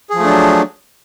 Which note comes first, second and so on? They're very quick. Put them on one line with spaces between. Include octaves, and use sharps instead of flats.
G#4 F3 A3 D4 F#3